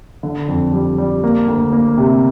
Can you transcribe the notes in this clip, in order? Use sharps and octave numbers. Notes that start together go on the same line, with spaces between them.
D3
F2
G3
G3
A#3
D2
A#3
C3